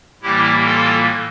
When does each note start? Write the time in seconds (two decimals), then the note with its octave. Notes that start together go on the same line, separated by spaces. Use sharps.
0.22 A2 E3 G3 A#3 E4 G4
0.65 F4 A4